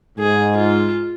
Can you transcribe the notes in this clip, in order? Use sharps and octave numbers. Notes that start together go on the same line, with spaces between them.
G#2 G#4
F4